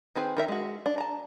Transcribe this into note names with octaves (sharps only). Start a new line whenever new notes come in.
D#3 C4 G#4 B4
D#3 A#4 E5
G#3 F#4
D4
A5 A#5